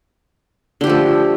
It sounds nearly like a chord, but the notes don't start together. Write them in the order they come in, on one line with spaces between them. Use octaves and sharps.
D3 G4 F3 A3